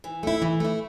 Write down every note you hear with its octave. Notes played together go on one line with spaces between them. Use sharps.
E3
A3 E4
E3
A3 E4